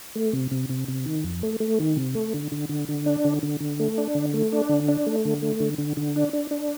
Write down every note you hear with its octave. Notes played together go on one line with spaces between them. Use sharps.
A3
C3
C3
C3
C3
D#3
F2
A3
A3
D#3
C3
A3
D3
D3
D3
D3
D4
D3
D3
D3
A3
D4
D3
A3
D4
D3
D4
A3
D3
A3
D3
D3
D3
D4
D4
D4